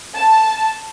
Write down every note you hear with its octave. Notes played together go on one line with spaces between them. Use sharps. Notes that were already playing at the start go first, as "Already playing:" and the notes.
A5